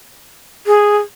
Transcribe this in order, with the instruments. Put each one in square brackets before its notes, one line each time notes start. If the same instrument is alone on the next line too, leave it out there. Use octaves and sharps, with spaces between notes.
[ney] G#4